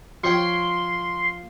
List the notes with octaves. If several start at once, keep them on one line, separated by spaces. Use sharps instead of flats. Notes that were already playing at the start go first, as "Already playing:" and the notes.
F3 C#5 G5 C6